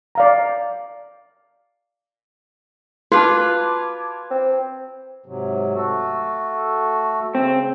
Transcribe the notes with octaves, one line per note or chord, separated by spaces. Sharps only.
D5 F5 A#5
F4 F#4 B4 A5 D6 G#6
C4
G#2 C3 F#3
A3 F#4 A4
C#3 C4